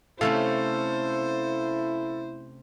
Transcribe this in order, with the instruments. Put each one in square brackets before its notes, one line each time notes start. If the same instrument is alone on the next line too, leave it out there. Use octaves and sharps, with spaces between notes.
[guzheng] C3 A3 C#4 [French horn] E4 [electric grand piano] A4 F5 [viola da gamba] C5